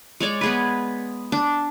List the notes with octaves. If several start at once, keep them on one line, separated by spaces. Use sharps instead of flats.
G#3 C#5 D5
B3 G#4 B4
D4